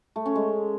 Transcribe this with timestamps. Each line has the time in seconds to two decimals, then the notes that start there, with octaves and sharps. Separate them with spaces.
0.16 A3
0.26 C#4
0.35 G#3